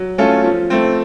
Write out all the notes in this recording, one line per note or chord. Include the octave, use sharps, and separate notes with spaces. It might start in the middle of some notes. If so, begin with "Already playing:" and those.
Already playing: F#3
A3 C#4 F4 A4
F3
A3 C4